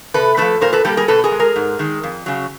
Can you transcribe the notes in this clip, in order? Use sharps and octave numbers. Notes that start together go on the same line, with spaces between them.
C3 A4 B4
F3 A3 A4 B4
A#2 A#4 C5
A4 B4
G3 A#3 G4 A4
G#4 A#4
B2 A4 B4
G#4 A#4
G#3
G#4 A#4
G#2
D#3 G#3
F2
C#3 F#3